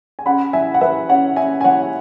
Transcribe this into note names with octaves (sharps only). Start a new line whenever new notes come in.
G#5
C#4 F#5 B5
E3 E5 G#5
F#5
E3 B4 E5
C#4 C#5 F#5
C#4 E5 G#5
G#5
E3 C#5 F#5